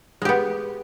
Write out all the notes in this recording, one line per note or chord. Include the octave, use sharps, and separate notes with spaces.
G#3 B3 G4